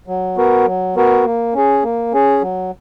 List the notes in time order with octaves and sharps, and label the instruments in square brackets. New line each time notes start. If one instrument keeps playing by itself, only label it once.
[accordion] F#3
B3 F#4 A#4
F#3
B3 F#4 A#4
A#3
C#4 G#4
A#3
C#4 G#4
F#3